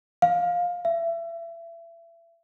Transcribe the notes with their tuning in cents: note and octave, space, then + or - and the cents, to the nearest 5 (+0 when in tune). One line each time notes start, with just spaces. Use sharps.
F5 +15
E5 +30